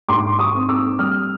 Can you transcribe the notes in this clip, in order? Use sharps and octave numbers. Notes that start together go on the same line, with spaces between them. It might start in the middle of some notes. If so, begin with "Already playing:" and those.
G#2 C6 D6
C#6 D#6
C4
D6 E6
G3 D#6 F6